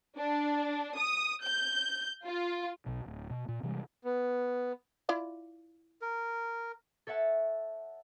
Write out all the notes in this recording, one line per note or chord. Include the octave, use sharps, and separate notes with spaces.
D4
D#6
G6
F4
B1 B2
D1
B2
A#2
C3 E3 G3 G#3
B3
E4 F4 D5
A#4
A4 C#5 E5 F#5 A5